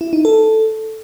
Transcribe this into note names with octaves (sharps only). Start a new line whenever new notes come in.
E4
D#4
A4